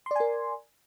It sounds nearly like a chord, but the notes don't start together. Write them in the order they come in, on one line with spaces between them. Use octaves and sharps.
C6 D5 G#5 A#4